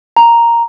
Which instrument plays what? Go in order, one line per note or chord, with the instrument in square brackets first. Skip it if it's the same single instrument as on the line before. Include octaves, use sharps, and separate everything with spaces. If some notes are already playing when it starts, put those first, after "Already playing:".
[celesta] A#5